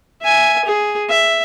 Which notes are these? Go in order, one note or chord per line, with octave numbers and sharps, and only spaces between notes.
E5 G#5
G#4
E5